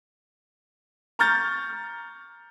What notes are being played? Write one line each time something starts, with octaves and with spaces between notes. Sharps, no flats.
A#5 C#6 F6 G6 A6